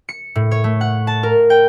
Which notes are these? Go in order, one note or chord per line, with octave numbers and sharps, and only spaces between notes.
C#7
A2
C#5
A3
F#5
A5
A#4
G5